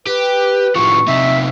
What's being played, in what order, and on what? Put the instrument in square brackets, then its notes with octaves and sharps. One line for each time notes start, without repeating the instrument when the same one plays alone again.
[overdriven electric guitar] G4 [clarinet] B4
[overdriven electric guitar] A2 F3 [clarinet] C#6
[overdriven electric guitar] C3 D#4 [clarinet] E5